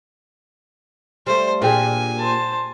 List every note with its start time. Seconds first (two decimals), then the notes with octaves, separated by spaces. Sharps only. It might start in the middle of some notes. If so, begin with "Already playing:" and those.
1.27 G3 A3 C5
1.62 A#2 D4 G4 G#4 G#5
2.19 C5 A5